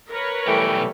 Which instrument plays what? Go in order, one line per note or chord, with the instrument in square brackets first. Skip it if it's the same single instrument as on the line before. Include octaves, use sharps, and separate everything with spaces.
[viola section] A#4 B4 C#5
[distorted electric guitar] B1 G5 [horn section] E3 G3 A3